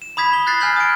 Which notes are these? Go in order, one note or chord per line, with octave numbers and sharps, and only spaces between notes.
E7
B5 D#6 G#6 B6
G7
F#6 G#6 A6 B6 C7
G#5 F6 G6 C7 F#7
D#6 D7